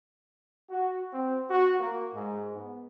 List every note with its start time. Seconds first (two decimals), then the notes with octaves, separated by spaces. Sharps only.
0.70 F#4
1.13 C4
1.50 F#4
1.80 A#3
2.13 G#2
2.56 B3